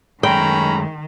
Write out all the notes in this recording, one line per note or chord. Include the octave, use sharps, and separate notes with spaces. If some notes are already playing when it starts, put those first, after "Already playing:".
F#2 D#3 G#3 A3 C#4 G5 A#5 B5